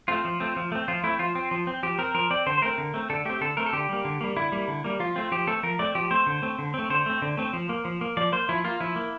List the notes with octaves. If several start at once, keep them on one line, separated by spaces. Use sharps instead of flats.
A3 C4 F4
F3
A3 C4
F3
A3 C4
F3 F4
A3 C4 E4
F3 F4
C4
F3
C4
F3 G4
C4 A#4
F3 A#4
C4 D5
D3 C5
C5
A3 C4 A#4
D3
A3 C4
D3 A4
A3 C4 G4
D3 A4
A3 C4 A#4
A4
D3 G4
G3 A#3
D3
G3 A#3
D3 E4
G3 A#3
D3
G3 A#3
F3 F4
A3 C4 F4
F3 G4
A3 C4 A4
F3 A#4
A3 C4 D5
F3 G4
A3 C4 C5
D3
A3 C4
D3
A3 C4
D3 C5
A3 C4
D3
A3 C4
F3
A#3
F3
A#3
F3 D5
A#3 C5
F3 E4
A#3 F4
F3 E4
A#3